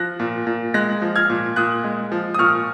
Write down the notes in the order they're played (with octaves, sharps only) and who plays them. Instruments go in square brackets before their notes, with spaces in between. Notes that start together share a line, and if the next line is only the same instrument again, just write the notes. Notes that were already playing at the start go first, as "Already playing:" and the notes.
Already playing: [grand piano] F3 F#6 A#6
A#2
A#2
G#3 F#6 A#6
F3
F6 G#6
A#2
A#2 D#6 F#6
G#3
F3
D#6
A#2 C#6 F6